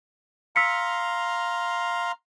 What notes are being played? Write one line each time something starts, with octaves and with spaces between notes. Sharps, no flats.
F5 A#5 C6 E6 B6 C#7